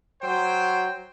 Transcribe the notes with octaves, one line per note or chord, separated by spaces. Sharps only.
F#3 C5 G5